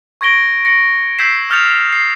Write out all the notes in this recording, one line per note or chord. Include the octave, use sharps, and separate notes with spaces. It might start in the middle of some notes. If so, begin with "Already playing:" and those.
C#6 G#6 A#6 D7 G7
A#6 C#7
E6 G6 G#6 B6 C7 E7
D#6 F6 G6 A6 C#7 F7
C7